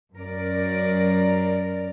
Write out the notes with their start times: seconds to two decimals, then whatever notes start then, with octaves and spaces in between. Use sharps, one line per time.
0.15 F#2 A#4 D5